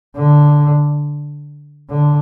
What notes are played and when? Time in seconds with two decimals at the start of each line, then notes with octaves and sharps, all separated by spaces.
0.16 D3
1.90 D3